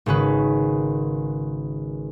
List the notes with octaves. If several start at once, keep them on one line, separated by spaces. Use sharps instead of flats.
G#1 C#3 C#4 B4